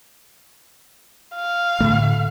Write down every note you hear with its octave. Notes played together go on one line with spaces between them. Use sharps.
F5
A2 D3 A3